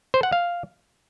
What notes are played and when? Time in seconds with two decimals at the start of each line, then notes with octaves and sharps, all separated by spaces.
0.14 C5
0.23 F#5
0.32 F5